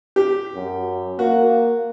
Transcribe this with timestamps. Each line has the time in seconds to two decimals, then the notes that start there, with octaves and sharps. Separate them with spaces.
0.16 G4
0.55 F#2
1.19 A#3 F#4